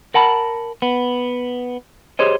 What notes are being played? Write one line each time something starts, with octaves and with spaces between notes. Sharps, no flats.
A#4 F#5 A5 B5
B3
G4 G#4 C5 C#5 D#5